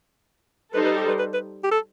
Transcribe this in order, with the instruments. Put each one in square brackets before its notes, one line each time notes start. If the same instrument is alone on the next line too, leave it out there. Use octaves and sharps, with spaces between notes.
[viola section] G3 D#4 A4 C5 [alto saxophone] B4
[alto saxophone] B4
G4
B4
B4
B4
G4
A4